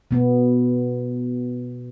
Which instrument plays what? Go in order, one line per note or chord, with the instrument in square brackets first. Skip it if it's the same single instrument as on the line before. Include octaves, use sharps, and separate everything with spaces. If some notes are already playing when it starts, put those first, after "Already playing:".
[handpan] B2 B3